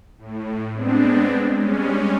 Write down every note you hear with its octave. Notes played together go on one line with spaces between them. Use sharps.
A2
G#3 B3 C4 D4
G3 G#3 C#4